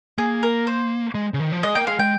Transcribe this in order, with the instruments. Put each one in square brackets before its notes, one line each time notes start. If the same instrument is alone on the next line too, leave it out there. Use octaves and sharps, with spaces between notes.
[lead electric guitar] A#3 [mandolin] G#4
[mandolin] A#4
C5
[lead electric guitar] G#3
C#3
D#3
F3
[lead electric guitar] G#3 [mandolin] D#5
[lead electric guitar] A#3 [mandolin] G5
[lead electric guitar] G#3 [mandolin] F5
[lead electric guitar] G#3 [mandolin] G5